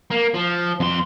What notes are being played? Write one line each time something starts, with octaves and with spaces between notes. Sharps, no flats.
A#3
F3
F2 C6